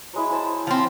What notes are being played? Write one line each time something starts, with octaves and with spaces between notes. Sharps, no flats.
F#3 G#3 E4
C5 G#5 A5
F3 C4